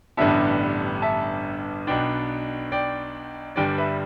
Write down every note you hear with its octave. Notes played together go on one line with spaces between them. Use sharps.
A1 G2 D3 G3 B3 E5 A5
E5 A5
B1 B2 B3 D4 D5 G5
D5 G5
G1 G2 G3 D4 D5 G5
B4 E5